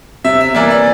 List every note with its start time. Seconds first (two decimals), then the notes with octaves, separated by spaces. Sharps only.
0.24 C3 E5
0.40 E5
0.55 E3 A#3 D5
0.70 D5